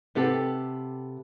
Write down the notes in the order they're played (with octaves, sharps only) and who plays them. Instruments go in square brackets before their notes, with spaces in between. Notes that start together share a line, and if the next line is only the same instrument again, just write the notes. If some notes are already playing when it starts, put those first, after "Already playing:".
[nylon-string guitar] C3 B3 G4 A4